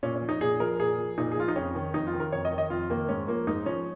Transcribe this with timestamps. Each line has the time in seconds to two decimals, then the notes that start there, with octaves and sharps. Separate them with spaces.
0.03 A#2 C#4
0.16 C#4
0.22 F3
0.29 D#4
0.41 A#2 G#4
0.60 F3 A#4
0.79 A#2 G#4
0.98 F3
1.18 A#2 D#4
1.32 G#4
1.37 F3 F4
1.48 D#4
1.56 F2 C#4
1.75 D#3
1.94 F2 D#4
2.07 F4
2.13 D#3
2.20 A#4
2.32 F2 C#5
2.45 D#5
2.52 D#3
2.58 D#5
2.70 F2 F4
2.90 D#3 A#3
3.09 G#2 C#4
3.28 F3 A#3
3.47 G#2 D#4
3.66 F3 C#4